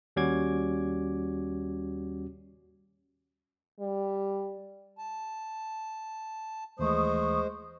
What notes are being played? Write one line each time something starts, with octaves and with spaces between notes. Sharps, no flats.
D#2 G3 C#4 F#4 D6 G#6
G3
A5
D#2 E3 G#3 A3 C5 C#6 D#6